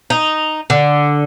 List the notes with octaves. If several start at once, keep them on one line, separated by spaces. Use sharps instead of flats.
D#4
D3